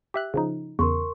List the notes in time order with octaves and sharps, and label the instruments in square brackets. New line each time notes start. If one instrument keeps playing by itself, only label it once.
[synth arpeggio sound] G4 E5 F#6
C#3 F3 D#4
[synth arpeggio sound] E2 C#3 [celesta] A#4 C6 C#6